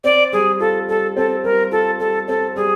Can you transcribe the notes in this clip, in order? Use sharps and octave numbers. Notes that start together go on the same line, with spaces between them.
C4 D5
G3 G#4
F4 A4
G3 A4
C4 A4
G3 A#4
F4 A4
G3 A4
C4 A4
G3 G#4